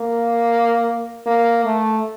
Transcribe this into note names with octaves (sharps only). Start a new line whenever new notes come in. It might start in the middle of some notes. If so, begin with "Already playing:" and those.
Already playing: A#3
A#3
A3